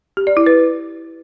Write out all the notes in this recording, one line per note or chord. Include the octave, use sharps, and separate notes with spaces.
G4
D5
E4
B4